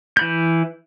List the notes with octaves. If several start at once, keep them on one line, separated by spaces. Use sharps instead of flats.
E3 B5 G6